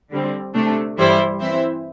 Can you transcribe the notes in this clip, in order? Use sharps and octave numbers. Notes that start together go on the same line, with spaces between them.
D3 G3 C4
C3 A3 D4
G2 E3 G3 E4 C5
E3 C4 E4 C5 E5